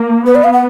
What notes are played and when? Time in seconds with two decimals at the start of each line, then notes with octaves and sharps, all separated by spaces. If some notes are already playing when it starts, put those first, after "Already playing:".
Already playing: A#3
0.26 B3 B4
0.35 D5
0.44 F5
0.53 F#5